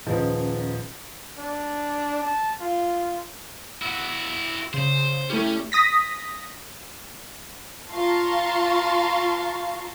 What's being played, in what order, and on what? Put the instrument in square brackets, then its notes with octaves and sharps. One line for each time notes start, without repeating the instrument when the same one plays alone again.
[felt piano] D#1 F3 G#3 C#4 D#4 B4
[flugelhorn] D4
A5
F4
[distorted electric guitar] E4 F#4 [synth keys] E6
[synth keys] C#3 [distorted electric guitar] C5
[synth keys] A3 E4 G4 [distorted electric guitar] C#4
[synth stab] D#6 A#6 B6
[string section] F4 F5 A5 A#5 C6 C#6